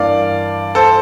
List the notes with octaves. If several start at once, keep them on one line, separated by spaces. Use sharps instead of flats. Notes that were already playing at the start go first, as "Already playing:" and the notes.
Already playing: G2 E3 A#3 D5 F5
A4 C5